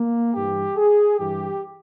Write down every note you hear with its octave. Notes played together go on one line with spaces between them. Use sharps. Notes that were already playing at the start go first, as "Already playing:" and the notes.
Already playing: A#3
G2 E3 G4
G#4
G2 E3 G4